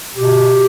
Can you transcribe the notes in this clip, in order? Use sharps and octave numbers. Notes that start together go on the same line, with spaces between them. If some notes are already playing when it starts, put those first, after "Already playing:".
B2 G4